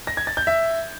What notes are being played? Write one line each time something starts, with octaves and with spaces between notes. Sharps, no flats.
A#6
G#6
A6
G6
E5